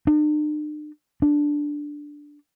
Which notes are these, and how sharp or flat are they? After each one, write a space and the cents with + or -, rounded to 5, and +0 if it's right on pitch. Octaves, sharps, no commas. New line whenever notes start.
D4 +45
D4 +0